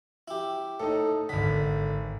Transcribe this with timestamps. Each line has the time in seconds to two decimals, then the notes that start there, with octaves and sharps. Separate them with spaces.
0.28 E4 G4
0.80 A2 D#4 A4
1.29 G#1 D3 B6